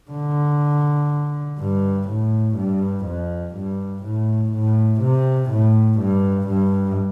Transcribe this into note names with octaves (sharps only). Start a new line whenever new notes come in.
D3
G2
A2
G2
F2
G2
A2
A2
C3
A2
G2
G2